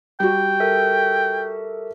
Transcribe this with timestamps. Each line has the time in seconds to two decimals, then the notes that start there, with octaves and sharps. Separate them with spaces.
0.20 G3 F#4 G5
0.60 A4 A#4 E5